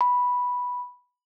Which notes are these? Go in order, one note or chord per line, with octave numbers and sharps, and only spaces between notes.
B5